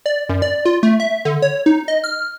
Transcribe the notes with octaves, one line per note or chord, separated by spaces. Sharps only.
D5
F#2
D5
F4
A3
E5
D3
C#5
D#4
D#5
F6